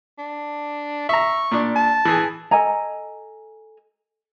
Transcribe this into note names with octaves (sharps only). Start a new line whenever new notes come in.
D4
E5 A#5 C#6
A#2 D4
A5
E3 G#4
A4 D#5 G#5 A#5